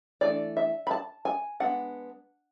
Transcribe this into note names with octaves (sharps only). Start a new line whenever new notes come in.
E3 A3 D4 D5
E5
B5
A5
G#5
G#3 B3 D4 F#5